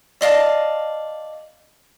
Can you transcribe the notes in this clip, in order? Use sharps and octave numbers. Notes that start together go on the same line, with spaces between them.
D5 D#5 F5 A5